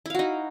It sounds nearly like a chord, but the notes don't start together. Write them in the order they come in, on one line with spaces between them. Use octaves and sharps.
E4 F5 F#4 D#4